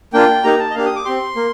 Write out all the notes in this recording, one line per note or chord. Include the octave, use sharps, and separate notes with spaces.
A#3 D4 F4 G5
A#3 D#4 G4 A#5
A5
D#5
A#3 D4 G4 F5
D#6
D6
C4 G4 C6
A#3